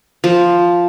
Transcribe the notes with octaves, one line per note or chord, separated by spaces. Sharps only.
F3